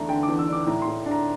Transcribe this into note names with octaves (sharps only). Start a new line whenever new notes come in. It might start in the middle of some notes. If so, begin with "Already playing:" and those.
Already playing: E2 A3 D4 A#5 C6
D3 G5
D6
E2
E6
D4 D6
A2 A#5
C6
A2
D4
A#5